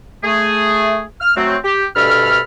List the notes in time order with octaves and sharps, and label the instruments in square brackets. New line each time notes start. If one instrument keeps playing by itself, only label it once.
[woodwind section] A3 G#4
F6
F#3 A3 C4
G4
D2 G2 B2 A4 B5 F6